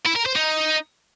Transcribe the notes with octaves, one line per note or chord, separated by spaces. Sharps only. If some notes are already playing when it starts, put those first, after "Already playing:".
E4
A#4
C5
D#4